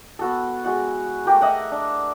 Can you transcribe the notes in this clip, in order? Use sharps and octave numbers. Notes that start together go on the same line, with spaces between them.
B3 F#4 A4
G#3 F#4 F#5
A3 G4 A#4
D#5 E5 F#5
D4